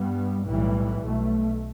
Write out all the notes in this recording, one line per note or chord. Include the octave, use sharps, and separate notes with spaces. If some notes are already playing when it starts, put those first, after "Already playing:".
Already playing: G2 G3 B3
B1 A2 E3 G3
B1 B2 A3